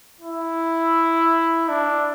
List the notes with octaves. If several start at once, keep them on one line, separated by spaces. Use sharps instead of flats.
E4
D4